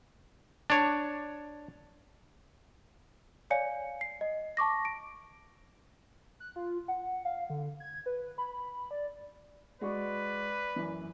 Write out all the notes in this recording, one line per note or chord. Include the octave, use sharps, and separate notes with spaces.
D4 C#5
C#5 D5 F5 G#5 C#7
C7
D#5
A5 C#6 D6 A#6
D7
F#6
F4
F#5
F5
D3
G#6
B4
B5
D5
G#3 F#4 B4 D5 C#6
F#2 E3